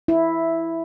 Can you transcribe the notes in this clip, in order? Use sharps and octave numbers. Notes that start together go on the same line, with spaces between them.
E4